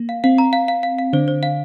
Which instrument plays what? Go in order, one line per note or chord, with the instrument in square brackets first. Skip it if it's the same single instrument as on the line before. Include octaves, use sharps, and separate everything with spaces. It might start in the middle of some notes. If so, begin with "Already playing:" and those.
Already playing: [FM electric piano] A#3
[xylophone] F5
[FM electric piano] C4 [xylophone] F5
[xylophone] A#5
F5
F5
F5
F5
[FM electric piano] D3 D4 [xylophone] C5
[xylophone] C5
F5